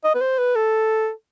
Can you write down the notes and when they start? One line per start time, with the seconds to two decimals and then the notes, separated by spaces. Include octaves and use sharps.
0.04 D#5
0.15 B4
0.21 C5
0.38 B4
0.56 A4